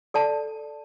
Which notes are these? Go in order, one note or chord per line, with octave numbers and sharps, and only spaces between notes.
A4 D5 A5